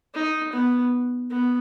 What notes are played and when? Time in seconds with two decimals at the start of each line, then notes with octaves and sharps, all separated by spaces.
0.15 D#4
0.53 B3
1.30 B3